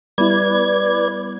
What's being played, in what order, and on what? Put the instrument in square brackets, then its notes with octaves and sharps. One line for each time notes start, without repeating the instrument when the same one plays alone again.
[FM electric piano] G3 B3 E4 [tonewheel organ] B4 D5 G#6